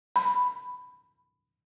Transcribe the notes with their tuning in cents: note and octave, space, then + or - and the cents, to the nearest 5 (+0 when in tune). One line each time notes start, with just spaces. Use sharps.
B5 +10